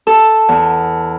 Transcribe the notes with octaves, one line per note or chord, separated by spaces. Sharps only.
A4
E2